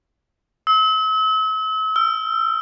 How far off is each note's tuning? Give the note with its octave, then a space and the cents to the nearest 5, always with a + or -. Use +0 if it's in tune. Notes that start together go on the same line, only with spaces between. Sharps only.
E6 -40
E6 +35